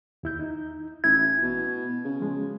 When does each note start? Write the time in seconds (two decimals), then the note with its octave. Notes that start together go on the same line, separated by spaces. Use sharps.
0.23 D#2 E4 G6
0.39 D#4
1.04 A1 E4 G#6
1.42 B2
2.04 C#3
2.20 F3 G#3